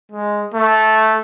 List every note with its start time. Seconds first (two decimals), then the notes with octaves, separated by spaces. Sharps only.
0.12 G#3
0.54 A3